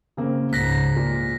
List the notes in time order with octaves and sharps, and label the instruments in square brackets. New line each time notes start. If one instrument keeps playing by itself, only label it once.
[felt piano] C#3 A#3 C4
[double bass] C#2 G#2 [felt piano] F#6 [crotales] A#6 B6
[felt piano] A#2